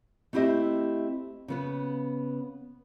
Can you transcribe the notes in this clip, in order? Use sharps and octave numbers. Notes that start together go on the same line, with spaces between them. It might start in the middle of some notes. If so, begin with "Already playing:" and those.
A3 C4 E4 G4 D#5 E5
C#3 B3 B4